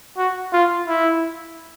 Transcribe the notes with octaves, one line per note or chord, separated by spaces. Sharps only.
F#4
F4
E4